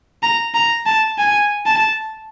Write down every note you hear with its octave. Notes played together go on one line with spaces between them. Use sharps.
A#5
A#5
A5
G#5
A5